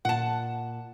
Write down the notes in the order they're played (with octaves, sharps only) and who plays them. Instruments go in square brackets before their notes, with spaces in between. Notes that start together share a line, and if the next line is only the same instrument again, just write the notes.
[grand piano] A#2 [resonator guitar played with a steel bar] F#5 A5